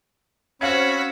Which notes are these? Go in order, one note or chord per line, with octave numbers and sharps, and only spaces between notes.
C4 C#4 F#4 F5 B5 E6 G#6